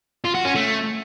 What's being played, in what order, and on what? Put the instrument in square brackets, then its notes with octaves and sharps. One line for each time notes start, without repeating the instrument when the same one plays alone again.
[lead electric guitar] F4
F#4
C#4
A3